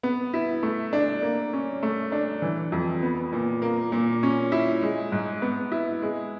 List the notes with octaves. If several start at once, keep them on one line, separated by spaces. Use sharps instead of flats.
B3
E4
A3
D4
A#3
C#4
A3
D4
E3
F2
B3
A#2
A#3
A#2
C#4
E4
G#3
G#2
B3
E4
G#3